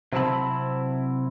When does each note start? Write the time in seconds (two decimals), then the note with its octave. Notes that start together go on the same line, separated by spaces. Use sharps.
0.13 C3 F#3 C4 E4 A5 B5